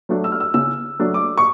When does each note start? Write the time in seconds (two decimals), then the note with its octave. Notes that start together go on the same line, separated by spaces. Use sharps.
0.09 F#3 A3 D4
0.24 E6
0.32 F6
0.40 E6
0.54 C#3 E6
0.99 F#3 A3 D4
1.14 D6
1.38 C#6